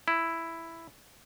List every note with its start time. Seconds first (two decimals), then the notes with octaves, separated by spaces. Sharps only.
0.08 E4